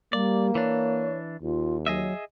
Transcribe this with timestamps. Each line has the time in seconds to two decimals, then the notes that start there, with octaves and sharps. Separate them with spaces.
0.13 G3 A#3 D5
0.55 E3 D4 C#5
1.42 D#2 F4
1.86 F#3 G#4 D#5 E5